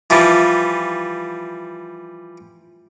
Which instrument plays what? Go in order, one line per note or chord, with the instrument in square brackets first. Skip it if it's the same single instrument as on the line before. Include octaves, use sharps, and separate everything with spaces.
[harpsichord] E3 F3 G3